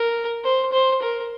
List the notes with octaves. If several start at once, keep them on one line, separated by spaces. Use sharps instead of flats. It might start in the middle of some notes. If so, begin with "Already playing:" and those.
Already playing: A#4
C5
C5
A#4